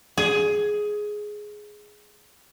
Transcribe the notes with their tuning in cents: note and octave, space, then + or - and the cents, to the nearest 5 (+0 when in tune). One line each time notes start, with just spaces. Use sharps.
G#4 +10